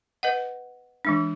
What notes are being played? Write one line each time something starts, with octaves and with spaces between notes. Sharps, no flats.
B4 D#5 F#5
E3 G#3 D4